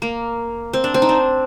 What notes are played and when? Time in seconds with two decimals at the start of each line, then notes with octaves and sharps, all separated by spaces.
0.02 A#3
0.73 C4
0.84 D4
0.94 C4
1.02 D#4
1.09 D4